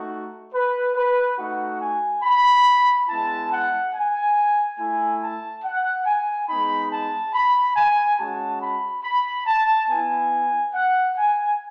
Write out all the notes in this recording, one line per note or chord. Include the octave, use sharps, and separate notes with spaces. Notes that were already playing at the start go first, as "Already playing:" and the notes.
Already playing: A3 D#4 F#4
B4
B4
A3 D#4 F#4 F#5
G#5
B5
G#3 B3 E4 A5
F#5
G#5
A3 E4 G#5
A5
F#5
G#5
G#3 B3 D#4 B5
A5
B5
G#5
G#3 C#4 F#4 A5
B5
B5
A5
B3 E4 G#5
F#5
G#5